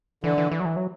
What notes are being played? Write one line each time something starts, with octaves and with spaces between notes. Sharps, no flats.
D3 E3
E3
E3
F#3
E3
F#3